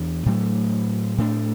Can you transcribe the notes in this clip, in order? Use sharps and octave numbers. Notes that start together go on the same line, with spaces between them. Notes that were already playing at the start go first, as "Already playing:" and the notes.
Already playing: E2 E3 D4
A2 F#3 A3
A2 A3 D4